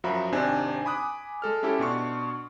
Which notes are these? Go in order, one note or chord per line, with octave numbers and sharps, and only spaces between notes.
F#2 F3 F#4 E5 A#5 B5
G#1 C3 C4 D4 D#4 G#5
G#5 B5 D6 D#6 F#6
G#3 A4 F6
C#4 E4 G4 A4
B2 D4 C6 C#6